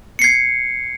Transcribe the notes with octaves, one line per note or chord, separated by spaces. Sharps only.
G#6 C7 C#7